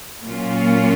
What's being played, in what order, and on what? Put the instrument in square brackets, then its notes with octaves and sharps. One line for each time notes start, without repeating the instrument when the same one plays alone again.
[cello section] A#2 F#3 A#3 C#4 F4